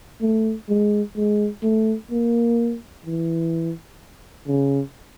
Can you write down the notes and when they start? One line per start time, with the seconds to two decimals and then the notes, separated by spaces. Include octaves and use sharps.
0.21 A3
0.69 G#3
1.17 G#3
1.63 A3
2.11 A#3
3.06 E3
4.47 C#3